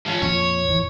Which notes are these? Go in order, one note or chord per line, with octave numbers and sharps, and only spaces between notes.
F3 C#4
F2 A#2 F3 C#5
A1 F2 E3